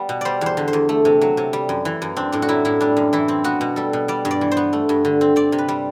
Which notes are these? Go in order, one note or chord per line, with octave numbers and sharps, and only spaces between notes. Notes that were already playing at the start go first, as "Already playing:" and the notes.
Already playing: G3 B3
B2
G3 C5 D5
E2 C5
D3
C5
E2
A3
C3
F#3
C3
G3
F#2
E3
F#2
C4 D4
A2 D4
F#4
F#3 E4
A2 E4
G3 D4
F#2
E3 E4
C4
B3 F#4
B2
G3 A4
B2
G3 D5
G2
D5
E3
C5
B3
A3
G2
D3
C4
C4 D5
C3
B4
G3